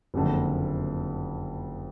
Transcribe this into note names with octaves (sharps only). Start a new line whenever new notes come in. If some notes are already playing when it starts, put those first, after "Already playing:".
F#1 F2 D3